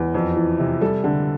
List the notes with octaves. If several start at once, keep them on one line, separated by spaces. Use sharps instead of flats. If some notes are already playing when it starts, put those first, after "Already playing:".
Already playing: E2
F2
E3
C3
G3 A4
D3